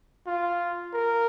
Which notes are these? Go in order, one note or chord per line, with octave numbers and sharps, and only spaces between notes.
F4
A#4